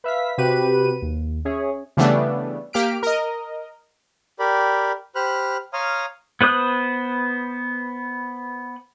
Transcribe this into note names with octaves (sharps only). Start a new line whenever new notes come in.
B4 E5 F5 B6
C3 F#4 G4 B4 D#7
D#2
C#4 G#4 C#5 E5
C#3 E3 G3 A3 B3 D4
A#3 G4 F6 B6 D7
A#4 D#5
G4 A#4 D5 B5
G4 C5 B5 F6 F#6
C#5 F5 A#5 C6 D#6 F6
B3 B4 C5 D#6 F#6